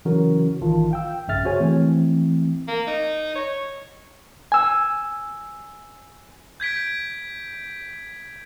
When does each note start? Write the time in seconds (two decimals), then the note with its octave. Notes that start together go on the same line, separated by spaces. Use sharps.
0.05 C#3 E3 F#3 C#4 F#4 A#4
0.61 A1 D#3 E3 F4 A5
0.91 F5 G5 E6
1.28 A#1 G2 C#3 E5 F6 A6
1.45 F#4 G#4 C5 C#5 G#5
1.60 E3 F3 A3 C4
2.68 A#3
2.87 D#4
3.35 C#5
4.52 G#5 E6
6.60 G6 G#6 B6 D7